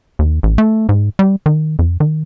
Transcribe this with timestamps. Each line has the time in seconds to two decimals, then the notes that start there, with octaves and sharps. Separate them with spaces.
0.19 D#2
0.43 A1
0.58 A3
0.89 G#2
1.19 G3
1.46 D#3
1.79 F2
2.00 D#3